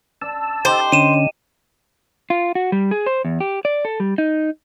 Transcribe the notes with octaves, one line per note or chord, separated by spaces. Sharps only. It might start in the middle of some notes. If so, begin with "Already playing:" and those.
D4 A5 E6
D#4 G4 C5
D3 C#4 D#7 E7
F4
F#4
G3
G#4
C5
E2
G4
D5
A4
G3
D#4